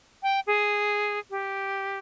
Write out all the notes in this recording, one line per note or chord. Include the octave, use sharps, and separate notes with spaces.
G5
G#4
G4